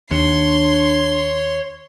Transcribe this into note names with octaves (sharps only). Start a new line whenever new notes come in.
D#2 D4 C#5 C6